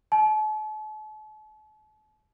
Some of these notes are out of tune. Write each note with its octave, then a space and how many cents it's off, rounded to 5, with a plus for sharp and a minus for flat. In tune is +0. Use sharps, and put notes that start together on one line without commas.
A5 -45